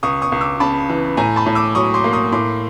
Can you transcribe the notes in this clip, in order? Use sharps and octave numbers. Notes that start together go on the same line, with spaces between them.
C#2 C#6 D#6
C#6 D#6
C#2
D6 E6
C#3 A5 B5
E3
A2 G#5 A#5
A5 B5
A2
D6 E6
F#3 C#6 D#6
C6 D6
A#3
C#6 D#6
A2 C6 D6